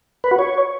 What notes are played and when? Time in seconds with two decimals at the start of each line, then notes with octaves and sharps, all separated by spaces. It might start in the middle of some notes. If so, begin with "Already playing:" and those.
0.24 B4
0.31 F#4
0.39 C#5